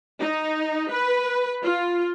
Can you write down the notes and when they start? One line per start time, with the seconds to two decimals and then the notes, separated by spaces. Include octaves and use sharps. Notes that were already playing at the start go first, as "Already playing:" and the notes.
0.19 D#4
0.91 B4
1.63 F4